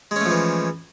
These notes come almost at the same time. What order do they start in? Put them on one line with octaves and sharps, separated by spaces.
G#3 C#4 A3 F3 E3